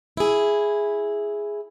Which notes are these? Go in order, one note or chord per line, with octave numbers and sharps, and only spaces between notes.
E4 G#4